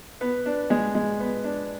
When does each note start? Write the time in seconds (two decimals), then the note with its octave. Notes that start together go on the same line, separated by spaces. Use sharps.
0.21 B3
0.46 D4
0.70 G#3
0.95 G#3
1.20 B3
1.44 D4